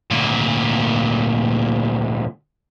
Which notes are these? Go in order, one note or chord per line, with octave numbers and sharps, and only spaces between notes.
D2 A#2